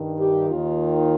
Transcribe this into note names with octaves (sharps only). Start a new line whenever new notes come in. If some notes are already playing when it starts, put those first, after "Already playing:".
Already playing: G2 D#3
G4
D#2 D#3 F4